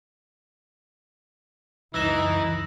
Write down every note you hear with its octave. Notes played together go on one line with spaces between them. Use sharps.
C#2 F#2 E3 D#4 E6 A#6 E7